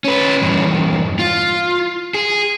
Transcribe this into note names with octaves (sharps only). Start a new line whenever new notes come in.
C#4 B4
E2 G2
F4
G#4